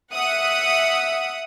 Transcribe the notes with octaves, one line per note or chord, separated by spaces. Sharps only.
E5 F#5 D#6